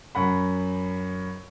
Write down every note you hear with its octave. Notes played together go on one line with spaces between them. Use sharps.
F#2 F#5 B5